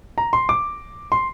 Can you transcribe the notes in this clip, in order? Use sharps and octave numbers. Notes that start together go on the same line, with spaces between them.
A#5
C6
D6
C6